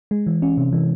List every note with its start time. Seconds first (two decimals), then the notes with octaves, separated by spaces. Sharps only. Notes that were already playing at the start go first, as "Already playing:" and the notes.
0.11 G#3
0.27 E3
0.42 C#4
0.58 C3
0.73 E3